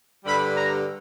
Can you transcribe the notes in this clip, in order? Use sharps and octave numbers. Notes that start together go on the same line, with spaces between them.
G2 D3 G3 B5
A#5